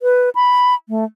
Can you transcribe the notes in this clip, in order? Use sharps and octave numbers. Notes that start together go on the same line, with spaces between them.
B4
B5
A3